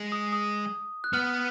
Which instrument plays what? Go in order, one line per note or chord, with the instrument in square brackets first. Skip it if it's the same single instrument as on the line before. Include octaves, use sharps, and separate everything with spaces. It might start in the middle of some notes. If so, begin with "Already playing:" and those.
Already playing: [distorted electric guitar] G#3
[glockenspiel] D#6
D#6
F#6
[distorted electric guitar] B3 [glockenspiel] F6